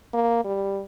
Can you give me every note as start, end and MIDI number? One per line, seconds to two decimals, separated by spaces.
0.14 0.42 58
0.44 0.82 55